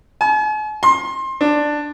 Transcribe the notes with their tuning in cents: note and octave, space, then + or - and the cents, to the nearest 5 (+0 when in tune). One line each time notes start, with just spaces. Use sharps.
G#5 +45
C6 +25
D4 +10